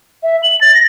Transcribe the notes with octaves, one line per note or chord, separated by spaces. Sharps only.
E5
F#7
A6
A#6